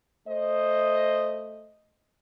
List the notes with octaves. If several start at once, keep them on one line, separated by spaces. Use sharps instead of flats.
A3 C5 D#5